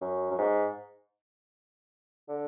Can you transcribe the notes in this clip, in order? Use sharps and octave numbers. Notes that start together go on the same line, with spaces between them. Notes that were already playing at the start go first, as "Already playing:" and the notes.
F#2
F#2
G#2
D3